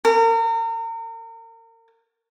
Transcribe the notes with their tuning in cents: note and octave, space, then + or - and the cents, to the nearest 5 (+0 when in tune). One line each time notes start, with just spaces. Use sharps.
A#4 -35